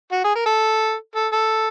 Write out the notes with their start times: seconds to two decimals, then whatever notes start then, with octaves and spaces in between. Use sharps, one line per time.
0.12 F#4
0.24 G#4
0.35 A#4
0.46 A4
1.15 A4
1.32 A4